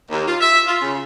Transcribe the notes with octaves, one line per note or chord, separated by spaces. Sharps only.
D#2
F4
E5
F4
C#3